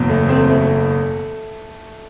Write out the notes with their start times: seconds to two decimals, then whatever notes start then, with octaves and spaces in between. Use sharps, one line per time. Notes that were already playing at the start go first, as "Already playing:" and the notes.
Already playing: F#1 E2 B2
0.09 A3
0.29 A3 C4
0.49 A3